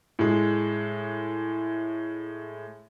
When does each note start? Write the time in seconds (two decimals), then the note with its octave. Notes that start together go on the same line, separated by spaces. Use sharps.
0.19 A2 G#3